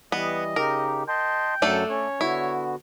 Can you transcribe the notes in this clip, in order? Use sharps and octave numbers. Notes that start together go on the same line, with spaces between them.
E3 G3 B3 D#5
C#3 D#4 G4 A#4
D#5 G5 A5 C6
F#2 F#3 A3 D4 A4
C#4 C#5
D3 B3 E4 F#4